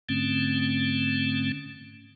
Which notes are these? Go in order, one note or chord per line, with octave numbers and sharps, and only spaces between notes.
G#2 D3 A3 C4 C#4